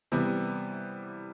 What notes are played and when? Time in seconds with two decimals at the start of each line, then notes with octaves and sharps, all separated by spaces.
0.12 C3 E3 G3 B3